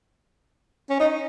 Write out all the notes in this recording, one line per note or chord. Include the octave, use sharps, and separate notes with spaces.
C#4
D#4